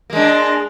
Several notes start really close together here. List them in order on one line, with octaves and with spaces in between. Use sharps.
A#3 G#3 D4